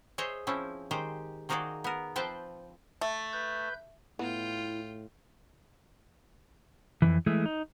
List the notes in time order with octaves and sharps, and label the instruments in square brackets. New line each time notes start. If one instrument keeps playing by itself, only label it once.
[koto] G#4 C5 C#5 D#5 E5
F3 C4 C#4 E4
D#3 G#3 G4 C5
D#3 A#3 D#4 F#4 G#4 D5
B3 A#4
F3 C4 B4 C5 G5 A5
[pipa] A3
[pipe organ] B4 G6
[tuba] A2 [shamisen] B3 [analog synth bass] E4 [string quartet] F4 G5
[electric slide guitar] F2 G#2 E3
E3 G#3 A3
D#4